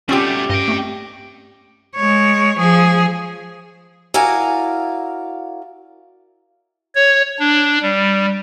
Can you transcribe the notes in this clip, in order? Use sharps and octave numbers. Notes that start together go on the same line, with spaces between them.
B2 G3 A3 C4 C#4 F4 G4 D6
G2 D#5 G5
A3 C4
G#3 C#5
F3 G#4
E4 F#4 A#4 D5 F5 G#5
C#5
D4
G3